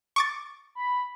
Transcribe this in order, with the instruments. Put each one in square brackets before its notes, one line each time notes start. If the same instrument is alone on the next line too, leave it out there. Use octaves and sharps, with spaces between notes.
[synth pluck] C#6 D6 A6
[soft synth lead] B5